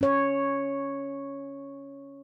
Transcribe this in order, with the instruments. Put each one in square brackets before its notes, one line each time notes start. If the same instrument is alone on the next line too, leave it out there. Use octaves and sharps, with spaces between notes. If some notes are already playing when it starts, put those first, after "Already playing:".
[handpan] C#4 C#5